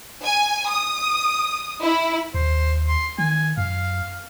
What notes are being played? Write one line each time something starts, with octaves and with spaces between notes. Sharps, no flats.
G#5
D#6
E4
D#2 C5
C6
D#3 G#5
F#2 F5